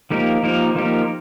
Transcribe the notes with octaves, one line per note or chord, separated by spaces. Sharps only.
F3 A#3 D#4 G4 A#4
F3 A#3 D#4 G4 A#4
F3 A#3 D#4 G4 A#4